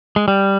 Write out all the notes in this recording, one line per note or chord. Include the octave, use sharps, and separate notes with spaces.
G#3
G3